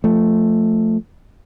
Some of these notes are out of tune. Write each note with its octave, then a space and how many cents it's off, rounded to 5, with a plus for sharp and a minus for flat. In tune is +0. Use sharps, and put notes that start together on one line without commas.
F3 +0 A3 +5